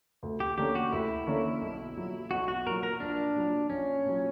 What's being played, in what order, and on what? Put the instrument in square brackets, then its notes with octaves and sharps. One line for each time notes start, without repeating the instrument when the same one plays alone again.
[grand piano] D2
[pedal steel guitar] G4
[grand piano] D3 A#3 C#4 [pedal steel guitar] G4
[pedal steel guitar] F#4
[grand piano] D2 [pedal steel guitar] E4
[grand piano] D3 A#3 C#4
B1
A#2 F#3
[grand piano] B1 [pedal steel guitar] F#4
[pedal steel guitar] F#4
[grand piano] A#2 F#3 [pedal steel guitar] A#4
[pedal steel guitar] A#4
[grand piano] A#1 [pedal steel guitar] D4
[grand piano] A#2 F#3
[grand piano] A#1 [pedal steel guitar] C#4
[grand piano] A#2 F#3